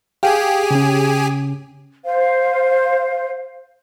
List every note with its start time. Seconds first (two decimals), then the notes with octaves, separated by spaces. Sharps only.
0.23 G4 G#4 F5 G5 G#5
0.71 C#3 C#4
2.04 C5 F5